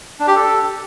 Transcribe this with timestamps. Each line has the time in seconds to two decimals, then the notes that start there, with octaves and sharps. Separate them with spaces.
0.20 D4
0.28 G4
0.35 A4